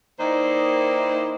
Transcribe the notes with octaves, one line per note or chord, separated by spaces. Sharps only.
D#3 A#3 D#4 E4 C5 D5